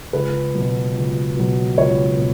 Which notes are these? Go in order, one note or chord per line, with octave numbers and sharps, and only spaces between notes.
C#2 B4
B2 F#3
C#2
B2 F#3
C#2 C#5
B2